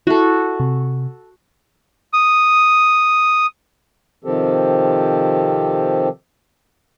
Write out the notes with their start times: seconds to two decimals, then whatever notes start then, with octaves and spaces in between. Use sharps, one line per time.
0.07 E4 F#4 A4
0.60 C3
2.13 D#6
4.24 C3 D#3 F3 C4 G4 A4